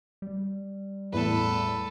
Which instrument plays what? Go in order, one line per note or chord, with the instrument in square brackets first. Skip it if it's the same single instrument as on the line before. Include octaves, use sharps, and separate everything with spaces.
[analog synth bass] G3
[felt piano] E2 A2 [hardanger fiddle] A4 B4